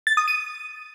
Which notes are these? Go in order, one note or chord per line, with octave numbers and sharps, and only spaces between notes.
A6
D#6
D#7